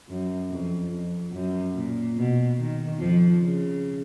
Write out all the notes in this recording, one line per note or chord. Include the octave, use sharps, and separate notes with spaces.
F#2
F2
F2
F#2
A#2
B2
D#3
F2 F3
C#3